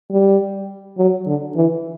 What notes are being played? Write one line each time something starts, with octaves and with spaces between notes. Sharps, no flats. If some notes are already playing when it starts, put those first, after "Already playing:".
G3
F#3
D3
E3